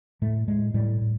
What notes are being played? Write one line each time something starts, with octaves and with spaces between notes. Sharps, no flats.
A2 A3
A2 G#3
A2 G3
A2